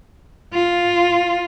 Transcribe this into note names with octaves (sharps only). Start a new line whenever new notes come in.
F4